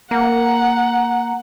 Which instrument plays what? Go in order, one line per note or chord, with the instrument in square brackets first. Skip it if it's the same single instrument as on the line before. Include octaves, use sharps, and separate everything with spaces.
[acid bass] A#3 [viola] F#5 [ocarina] A#5